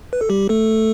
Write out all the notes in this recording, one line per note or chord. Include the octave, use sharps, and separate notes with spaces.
B4
A4
G3 G4
A3 A4